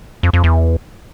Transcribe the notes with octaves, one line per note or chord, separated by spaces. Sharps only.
F2
F2
E2